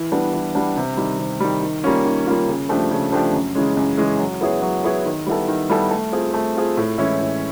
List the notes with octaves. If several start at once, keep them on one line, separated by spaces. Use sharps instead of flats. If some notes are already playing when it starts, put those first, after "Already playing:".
Already playing: E3
G3 B3 D4
E3
G3 B3 D4
C3
D#3 G3
C3
D#3 G3
D#3
G3 A#3 C#4 F4
D#3
G3 A#3 C#4 F4
C#3
F3 A3 D4 G4
C#3
F3 A3 D4 G4
F#2
C#3 E3 G#3 C#4
F#2
C#3 E3 G#3 C#4
F#3
B3 E4 G#4 C#5
F#3
B3 E4 G#4 C#5
D#3
G3 B3 E4 A4
D#3
G3 B3 E4 A4
A3
C4 F4 G#4
A3
C4 F4 G#4
A2
E3 G#3 C#4 E4
A2